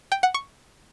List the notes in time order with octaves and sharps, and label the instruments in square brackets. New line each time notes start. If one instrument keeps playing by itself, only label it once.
[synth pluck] G5
F#5
C#6